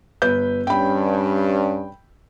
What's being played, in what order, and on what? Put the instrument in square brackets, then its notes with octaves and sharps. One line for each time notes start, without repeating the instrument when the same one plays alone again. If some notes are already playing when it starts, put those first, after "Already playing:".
[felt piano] G1 B4 G6
[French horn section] G2 C#4 [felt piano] G5 B5